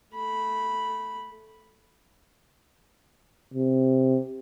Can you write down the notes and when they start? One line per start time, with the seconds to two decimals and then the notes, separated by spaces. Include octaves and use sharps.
0.14 A3 B5
3.54 C3